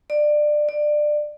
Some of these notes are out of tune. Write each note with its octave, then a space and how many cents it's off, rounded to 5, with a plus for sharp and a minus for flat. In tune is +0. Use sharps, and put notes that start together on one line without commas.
D5 +20
D5 +20